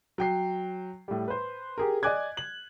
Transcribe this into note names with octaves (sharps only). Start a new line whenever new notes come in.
F#3 G5 C7
A2 G3
B4 C5
G4 G#4 A#4
D5 D#5 G#5 D6 F#6 G#6
F#7